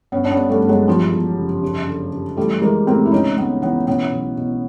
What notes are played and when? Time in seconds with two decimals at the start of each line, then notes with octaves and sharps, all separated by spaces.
0.12 G1 B3 C#4
0.25 D4
0.31 B3 C#4
0.37 G2
0.49 G3 A3
0.62 G1
0.69 F#3 G#3
0.88 E2 F3 G3
1.12 E2
1.38 F#1
1.63 D#2
1.87 D3
2.12 D3
2.37 E3 G3 A3
2.62 E3 G#3 A#3
2.87 A2 A#3 C4
3.06 E4
3.12 C#2 C#4 D#4
3.37 C#2 B3 C#4
3.62 E3 B3 C#4
3.87 B2 B3 C#4
4.11 B1
4.37 B2